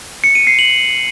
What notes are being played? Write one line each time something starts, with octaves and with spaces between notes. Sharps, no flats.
C#7
D#7
C7
F#7